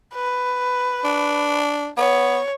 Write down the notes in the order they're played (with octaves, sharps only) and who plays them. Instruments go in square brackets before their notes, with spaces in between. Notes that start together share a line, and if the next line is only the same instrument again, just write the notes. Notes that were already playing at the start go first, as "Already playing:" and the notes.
[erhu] B4
[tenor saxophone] D4
[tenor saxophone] B3 [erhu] C#5